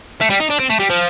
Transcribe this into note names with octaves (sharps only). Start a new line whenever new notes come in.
A3
G3
D#4
D4
C4
A3
G3
F3